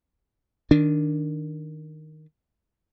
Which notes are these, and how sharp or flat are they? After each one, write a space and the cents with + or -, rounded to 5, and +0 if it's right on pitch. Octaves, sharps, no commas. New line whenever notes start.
D#3 +0 D4 +0